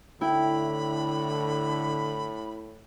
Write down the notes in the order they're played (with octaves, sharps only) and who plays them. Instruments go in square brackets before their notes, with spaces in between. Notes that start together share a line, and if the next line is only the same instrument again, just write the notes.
[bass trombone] A2 [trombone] D3 [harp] E4 G5 [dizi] B5